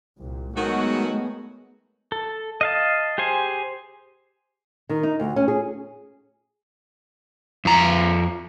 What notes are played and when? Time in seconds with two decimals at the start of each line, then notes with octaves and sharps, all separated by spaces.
0.19 C2 A#2
0.56 D#3 F#3 G#3 A3 B3 F#4
2.12 A4
2.61 D#5 F5 A5
3.18 G4 G#4 C5 G#5
4.89 D#3
5.03 D#4
5.20 D2
5.36 C#4
5.48 G#4
7.65 F2 A#5